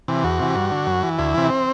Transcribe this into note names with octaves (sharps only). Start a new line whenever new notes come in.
C3 E3
E2 F#4
C3 E3
G2
D3
F#2
E3
D2 E4
C3 E3
C4